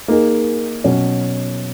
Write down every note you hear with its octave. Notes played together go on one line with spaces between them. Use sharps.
A#3 D#4 G#4
B2 F#3 C#4